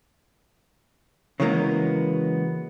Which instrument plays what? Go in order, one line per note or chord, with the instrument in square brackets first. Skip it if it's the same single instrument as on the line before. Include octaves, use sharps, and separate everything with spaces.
[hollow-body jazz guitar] C#3 E3 F#3 G#3 A#3 B3